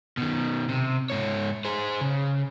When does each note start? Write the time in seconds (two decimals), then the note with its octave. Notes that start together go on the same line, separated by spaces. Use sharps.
0.17 B2 D#3
0.69 C3
1.10 G#2 C#5
1.65 G#4 C5
2.01 C#3